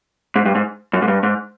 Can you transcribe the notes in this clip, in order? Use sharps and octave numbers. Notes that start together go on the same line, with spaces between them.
G#2
G2
G#2
F#2
G#2
G2
G#2